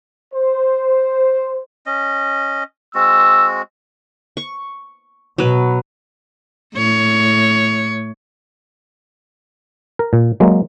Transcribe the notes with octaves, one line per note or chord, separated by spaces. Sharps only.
C5
C#4 D#5
G#3 C4 F#4 E6
C#6
B2 F#3 B4
A2 C#5
A#4
A#2
F#3 G#3 A#3